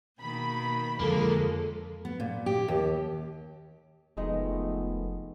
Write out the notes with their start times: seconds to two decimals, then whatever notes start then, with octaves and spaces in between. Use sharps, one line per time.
0.20 B2 D#3 A#3 B5
1.00 F2 D3 F3 G#3 A#3 A4
2.05 B3
2.20 A#2
2.46 G4
2.68 D#2
4.17 F1 D#3 F3 G#3 A3 B3 D#4